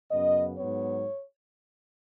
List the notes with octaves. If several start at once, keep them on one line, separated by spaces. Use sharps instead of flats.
F#2 C#3 B3 D#5
G#2 F#3 B3 C#5